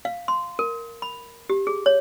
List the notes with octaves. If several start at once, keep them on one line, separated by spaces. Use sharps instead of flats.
F5
C6
A#4
B5
G4
G#4
C#5